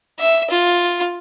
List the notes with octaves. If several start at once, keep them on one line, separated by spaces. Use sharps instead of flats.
E5
F4